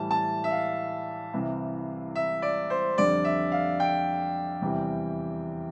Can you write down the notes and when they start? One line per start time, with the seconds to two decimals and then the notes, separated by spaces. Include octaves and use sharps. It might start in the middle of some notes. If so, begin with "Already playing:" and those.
Already playing: A2 E3 G3 A5
0.11 A5
0.44 E5
0.51 F5
1.33 C2 C3 E3
2.15 E5
2.42 D5
2.70 C5
2.97 F2 D3 G3 D5
3.25 E5
3.52 F5
3.80 G5
4.62 E2 C3 E3 G3